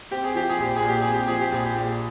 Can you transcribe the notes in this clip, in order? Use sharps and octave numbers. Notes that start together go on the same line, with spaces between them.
C4 G4
G#4
F3 G4
G#4
A#1 G4
A#2 G#4
G4
C4 G#4
G4
F3 G#4
G4
A#1 G#4
G4
A#2